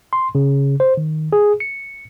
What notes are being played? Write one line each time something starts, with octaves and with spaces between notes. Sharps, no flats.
C6
C#3
C5
D#3
G#4
C#7